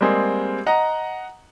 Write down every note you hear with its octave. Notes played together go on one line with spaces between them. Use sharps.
G3 G#3 A#3 C4 G#4
D#5 F#5 A#5